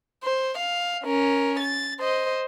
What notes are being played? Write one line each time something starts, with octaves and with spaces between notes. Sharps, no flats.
C5
F5
C#4 A#4
A6
C5 D#5